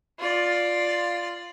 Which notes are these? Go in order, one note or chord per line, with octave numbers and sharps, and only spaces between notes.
F4 D5